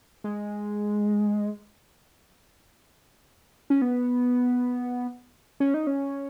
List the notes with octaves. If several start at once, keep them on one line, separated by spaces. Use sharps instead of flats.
G#3
C#4
B3
C#4
D#4
C#4